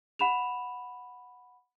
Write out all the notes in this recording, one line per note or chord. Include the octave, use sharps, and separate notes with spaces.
F#5 B5 E7 F7